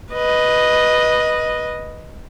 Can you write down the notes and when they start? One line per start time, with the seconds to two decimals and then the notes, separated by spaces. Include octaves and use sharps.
0.13 B4 D#5